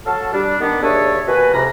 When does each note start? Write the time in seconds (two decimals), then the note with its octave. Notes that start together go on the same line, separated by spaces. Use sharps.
0.06 F#3 F#4 A4 F5 A5
0.33 G3 D4
0.60 D#3 B3 D4
0.82 D#2 D4 G#4 A4 C#5 E5
1.27 D#2 B2 F#4 B4 G#5
1.53 F2 G#2 C3 A#5 B5 F6